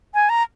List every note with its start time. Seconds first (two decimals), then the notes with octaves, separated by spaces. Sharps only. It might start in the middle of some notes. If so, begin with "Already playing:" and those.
0.14 G#5
0.29 A#5